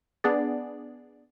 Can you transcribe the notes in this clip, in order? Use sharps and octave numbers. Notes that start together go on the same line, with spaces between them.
B3 D4 G#4 D5